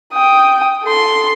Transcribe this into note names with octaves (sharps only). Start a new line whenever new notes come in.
G5 D#6
A4 C6